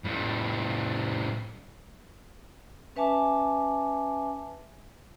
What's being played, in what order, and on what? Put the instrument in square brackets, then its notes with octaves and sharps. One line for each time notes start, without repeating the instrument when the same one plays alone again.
[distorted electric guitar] A2 G3
[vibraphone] C#4 B4 E5 G#5 A5 D6